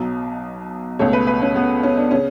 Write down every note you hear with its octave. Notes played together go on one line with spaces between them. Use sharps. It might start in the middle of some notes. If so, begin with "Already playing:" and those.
Already playing: B1 B2 F#3
C#2 B2 A3 C#5
B4
B4
C#4
B3
C#4
D4
C#3 C#4